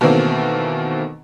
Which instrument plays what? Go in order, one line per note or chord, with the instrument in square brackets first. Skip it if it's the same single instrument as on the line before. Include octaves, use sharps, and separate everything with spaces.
[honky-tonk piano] B2 D#3 E3 A3 A#3 C4